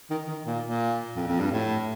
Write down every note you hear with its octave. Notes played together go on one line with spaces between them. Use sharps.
D#3
D#3
A#2
A#2
F2
F2
G2
A2